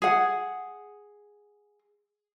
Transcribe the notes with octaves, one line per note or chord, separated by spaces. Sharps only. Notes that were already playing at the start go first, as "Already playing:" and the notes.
G#4 F#5